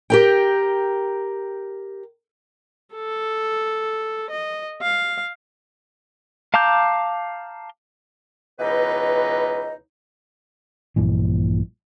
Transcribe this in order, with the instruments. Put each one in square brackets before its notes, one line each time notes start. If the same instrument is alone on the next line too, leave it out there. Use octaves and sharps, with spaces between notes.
[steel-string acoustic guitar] G4 A#4 G5
[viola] A4
D#5
F5
[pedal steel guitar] F5 A5 A#5 D6 G6
[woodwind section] C#2 B2 E3 D#4 B4 D#5
[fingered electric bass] A#1 G2 A#2 E3